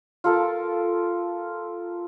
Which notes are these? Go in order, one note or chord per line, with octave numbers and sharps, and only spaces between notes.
F4 A4 A#4 A5